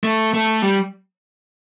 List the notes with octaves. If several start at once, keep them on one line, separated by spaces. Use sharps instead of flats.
A3
A3
G3